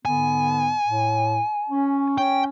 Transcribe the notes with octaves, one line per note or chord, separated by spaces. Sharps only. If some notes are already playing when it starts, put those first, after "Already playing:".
G#2 D3 B3 G#5
A2
C#4
C#4 G5